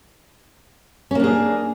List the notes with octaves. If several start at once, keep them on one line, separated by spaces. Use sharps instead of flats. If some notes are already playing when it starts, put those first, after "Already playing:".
A#3 C#4 D4 G#4